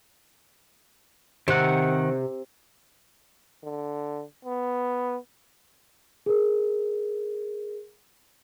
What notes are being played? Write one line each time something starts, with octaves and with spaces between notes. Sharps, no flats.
C3 D#3 F#5
D3
B3
G#4 A#4